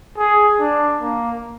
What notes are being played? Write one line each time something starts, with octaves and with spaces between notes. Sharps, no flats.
G#4
D4
A#3